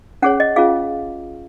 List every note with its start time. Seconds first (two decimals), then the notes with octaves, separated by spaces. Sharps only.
0.22 C#4 G#4 C#5 F#5
0.40 D#5
0.56 C#4 F4 G#4 F5